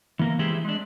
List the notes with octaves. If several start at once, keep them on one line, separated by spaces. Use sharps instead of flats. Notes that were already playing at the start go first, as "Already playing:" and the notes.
E3 A#3 A#4
E3 G#3 C4 E4 G4
G#3 D4